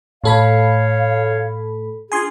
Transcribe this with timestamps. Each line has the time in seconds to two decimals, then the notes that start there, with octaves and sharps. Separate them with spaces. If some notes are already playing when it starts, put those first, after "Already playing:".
0.24 A2 A4 C#5 F5 B5
2.12 D4 F4 G#4 G#5 C6